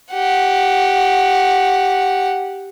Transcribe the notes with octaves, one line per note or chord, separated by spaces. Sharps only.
G4 F#5